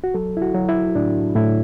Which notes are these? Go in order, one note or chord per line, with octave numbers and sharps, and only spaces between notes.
F#4
F#3 A4
E4
F#4
F#3
E4
A2 D4
A2 E4